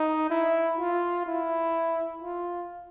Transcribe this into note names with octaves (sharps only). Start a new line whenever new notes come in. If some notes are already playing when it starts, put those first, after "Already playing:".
Already playing: D#4
E4
F4
E4
F4